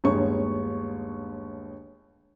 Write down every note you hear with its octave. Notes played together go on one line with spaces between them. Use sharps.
G1 D#2 G#3 C#5 C#6